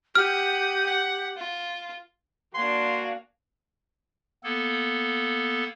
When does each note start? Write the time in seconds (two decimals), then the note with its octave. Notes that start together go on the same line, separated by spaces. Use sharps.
0.15 G4 F#5 D#6 F6
0.86 F#5
1.37 F4
2.54 A#3 D4 F#4 F5 G#5 C6
4.44 A#3 B3 A4